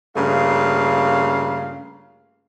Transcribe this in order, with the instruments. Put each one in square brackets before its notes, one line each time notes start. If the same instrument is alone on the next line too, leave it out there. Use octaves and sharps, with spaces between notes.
[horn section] G2 C#3 A3 A#3 F4 F5